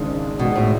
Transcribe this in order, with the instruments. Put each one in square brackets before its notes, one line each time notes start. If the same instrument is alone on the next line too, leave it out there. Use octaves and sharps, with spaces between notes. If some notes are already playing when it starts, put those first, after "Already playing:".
Already playing: [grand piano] G#1 G#2 G#3 D4 [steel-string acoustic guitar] C#3
[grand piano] G#2 G#3 B3 D4 [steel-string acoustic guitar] B2
[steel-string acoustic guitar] A2